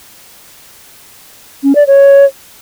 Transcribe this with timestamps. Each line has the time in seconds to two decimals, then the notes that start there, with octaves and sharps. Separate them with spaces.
1.63 C#4
1.75 D5
1.87 C#5